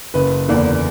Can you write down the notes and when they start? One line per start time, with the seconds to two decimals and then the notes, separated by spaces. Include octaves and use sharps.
0.14 F#1 B4
0.48 E2 D3 A#3 D4